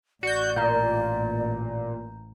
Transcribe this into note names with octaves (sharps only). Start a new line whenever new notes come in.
A1 F#4 D5 G6
A#2 A#5 G6